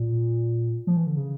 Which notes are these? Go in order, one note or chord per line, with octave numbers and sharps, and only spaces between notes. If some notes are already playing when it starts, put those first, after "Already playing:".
Already playing: A#2
F3
E3
D3
C#3